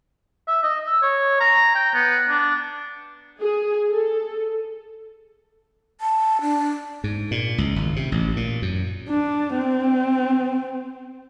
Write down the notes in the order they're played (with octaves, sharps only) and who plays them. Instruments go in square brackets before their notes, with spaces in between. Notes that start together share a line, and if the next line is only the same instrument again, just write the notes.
[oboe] E5
D#5
E6
C#5
A#5
G5
B3
D4
[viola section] G#4
A4
[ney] A5
D4
[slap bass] G#2
A#2
C#2
G#1
C3
A1
A#2
F#2
[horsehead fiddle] D4
C4